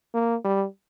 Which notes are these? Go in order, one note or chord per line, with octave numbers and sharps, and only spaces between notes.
A#3
G3